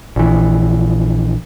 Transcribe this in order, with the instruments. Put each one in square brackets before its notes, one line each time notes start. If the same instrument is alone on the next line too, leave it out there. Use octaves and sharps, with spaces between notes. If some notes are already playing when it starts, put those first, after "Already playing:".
[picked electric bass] A#1 E3